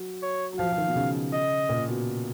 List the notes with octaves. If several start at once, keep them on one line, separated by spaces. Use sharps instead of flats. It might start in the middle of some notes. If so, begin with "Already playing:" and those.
Already playing: F#3
C#5
F#3
F3 F5
F3
D#3
B2
C#3
D#5
A#2
B2